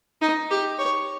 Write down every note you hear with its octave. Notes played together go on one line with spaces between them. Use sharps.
D#4
G4
C#5